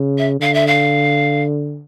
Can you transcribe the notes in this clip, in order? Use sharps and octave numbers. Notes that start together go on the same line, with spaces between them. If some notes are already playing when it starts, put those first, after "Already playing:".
Already playing: C#3
E5
D3 F5
E5
F5